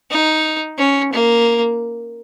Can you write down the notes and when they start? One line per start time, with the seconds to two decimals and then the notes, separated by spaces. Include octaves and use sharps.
0.11 D#4
0.78 C#4
1.13 A#3